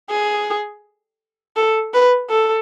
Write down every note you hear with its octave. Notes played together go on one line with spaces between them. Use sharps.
G#4
A4
B4
A4